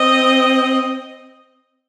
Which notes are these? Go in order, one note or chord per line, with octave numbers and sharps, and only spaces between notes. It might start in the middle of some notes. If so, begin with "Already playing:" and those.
Already playing: C4 D#5